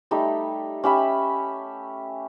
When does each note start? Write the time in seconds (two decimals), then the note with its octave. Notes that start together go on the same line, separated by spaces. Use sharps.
0.11 G3 A3 D#4
0.84 C#4 G4 E5 B5